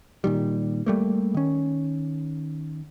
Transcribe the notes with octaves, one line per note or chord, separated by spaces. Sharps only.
A#2 D#3 G3
G3 A3 A#3
D#3 C#4